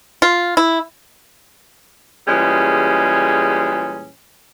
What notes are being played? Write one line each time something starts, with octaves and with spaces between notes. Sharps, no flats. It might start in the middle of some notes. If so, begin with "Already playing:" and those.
F4
E4
A#2 E3 G3 G#3 C#4 G#4